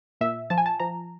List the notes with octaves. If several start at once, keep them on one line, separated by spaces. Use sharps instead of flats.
A#2 E5
F3 A5
G#5
A5
F3 A#5